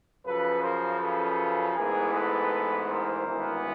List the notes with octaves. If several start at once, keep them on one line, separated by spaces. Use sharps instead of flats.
F#2 C#3 F3 A4 B4
A#4 C5
A4 B4
A1 G#2 E3 G#3 B3 G#4 A#4
A4 B4
A#4 C5
G#1 G2 E3 G#3 B3